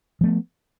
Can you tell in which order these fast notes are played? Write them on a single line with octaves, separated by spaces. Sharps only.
F3 A3 B3